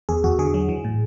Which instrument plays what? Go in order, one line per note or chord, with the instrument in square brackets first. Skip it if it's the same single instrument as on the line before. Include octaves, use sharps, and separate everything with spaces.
[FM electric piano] E2 G#4
E2 F#4
D3 G#4
F#3
E3
A2